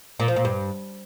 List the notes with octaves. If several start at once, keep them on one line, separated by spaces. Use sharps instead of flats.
A#2
F3
A#2
G2